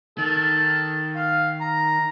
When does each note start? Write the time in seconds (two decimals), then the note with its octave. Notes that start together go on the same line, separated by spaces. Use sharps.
0.18 D#3 A4
1.16 F5
1.61 A#5